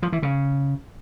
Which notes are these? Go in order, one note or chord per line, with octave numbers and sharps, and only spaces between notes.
F3
E3
C#3